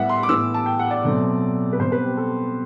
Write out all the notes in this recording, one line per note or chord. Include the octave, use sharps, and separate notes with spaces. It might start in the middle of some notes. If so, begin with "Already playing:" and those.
Already playing: A2 G3 B3 E5 F#5
C6
D6
A2 E3 B3 E6
A5
G5
F#5
D5
B2 F#3 A3 C4
B4
B2 G3 C4 C5
B4
G4
A4